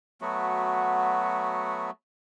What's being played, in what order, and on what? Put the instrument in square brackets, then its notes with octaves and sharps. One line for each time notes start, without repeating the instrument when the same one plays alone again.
[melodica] F#3 A3 B3 F#4